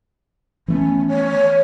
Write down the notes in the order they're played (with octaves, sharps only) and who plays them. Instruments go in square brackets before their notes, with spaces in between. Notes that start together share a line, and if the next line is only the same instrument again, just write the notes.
[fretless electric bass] E3 A3 B3 [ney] C#4
[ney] C#5